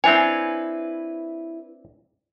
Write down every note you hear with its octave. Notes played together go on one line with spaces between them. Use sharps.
C4 D4 E4 B4 C#5 G#5